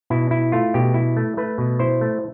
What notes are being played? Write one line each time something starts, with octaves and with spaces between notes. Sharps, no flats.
B2 E4
E4
A3 F4
B2 G4
E4
A3
A3 B4
B2
E4 C5
A3